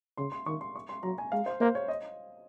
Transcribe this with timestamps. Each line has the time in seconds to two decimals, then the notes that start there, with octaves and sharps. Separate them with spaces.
0.17 C#3 C6
0.32 C6
0.46 D#3 C#6
0.61 C6
0.76 C#6
0.89 C6
1.03 F#3 A#5
1.18 G#5
1.32 G#3 F5
1.46 C5
1.60 A#3 C5
1.75 C#5
1.88 D#5